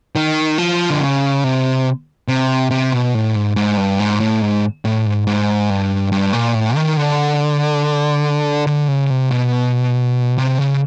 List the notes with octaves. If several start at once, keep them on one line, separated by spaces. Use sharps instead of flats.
D#3
F3
D3
C#3
C3
C3
C3
B2
A2
G#2
G#2
G2
G#2
A2
G#2
A2
G#2
G#2
G2
G2
A#2
A2
D#3
D3
D3
C#3
C3
B2
C3
C#3